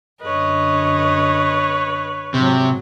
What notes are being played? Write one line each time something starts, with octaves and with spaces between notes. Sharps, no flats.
F#2 D3 B4 C#5 D#5
G#2 C3 F#3